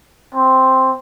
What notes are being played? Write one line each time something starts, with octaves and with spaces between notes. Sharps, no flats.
C4